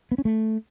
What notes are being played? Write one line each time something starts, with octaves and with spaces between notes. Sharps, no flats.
B3
C#4
A3